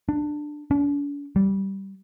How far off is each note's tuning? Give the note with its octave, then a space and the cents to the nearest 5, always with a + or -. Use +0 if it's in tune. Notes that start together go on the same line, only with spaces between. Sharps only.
D4 +15
D4 -45
G3 -10